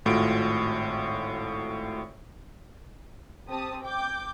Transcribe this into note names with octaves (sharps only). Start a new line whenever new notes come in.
G#1 A2 F4 F#4 D7
C4 G4 A5 D#6
G5 D6 G6